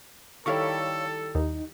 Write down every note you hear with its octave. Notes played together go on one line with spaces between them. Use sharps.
D#3 G3 E4 A4 C#5 F5 C#6
D#2 D#4